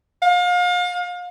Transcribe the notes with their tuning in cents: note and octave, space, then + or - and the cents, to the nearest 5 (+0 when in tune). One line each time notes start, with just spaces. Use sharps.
F5 +35